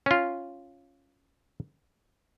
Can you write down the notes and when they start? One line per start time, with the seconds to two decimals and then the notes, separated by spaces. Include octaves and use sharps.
0.06 C#4 F4